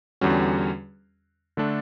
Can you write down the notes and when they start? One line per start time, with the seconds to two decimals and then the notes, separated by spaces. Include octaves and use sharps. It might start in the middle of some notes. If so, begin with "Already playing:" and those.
0.21 E2 D3 G3 C#4 F#4
1.57 D3 A3 D4 A4